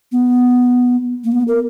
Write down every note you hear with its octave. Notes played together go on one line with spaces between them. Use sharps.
B3
A#3
B3
A#4